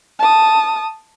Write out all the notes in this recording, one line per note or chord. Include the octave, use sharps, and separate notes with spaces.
A5 D#6